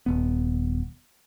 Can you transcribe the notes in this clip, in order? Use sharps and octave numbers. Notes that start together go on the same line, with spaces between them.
D#1 B3